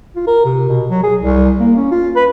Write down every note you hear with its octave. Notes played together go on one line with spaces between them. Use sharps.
F4
A#4
C3
B2
F#3
G#4
C2
A#3
C#4
F4
B4